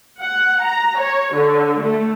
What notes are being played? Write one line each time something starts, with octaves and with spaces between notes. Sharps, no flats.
F#5
A#5
C#5
D3
A3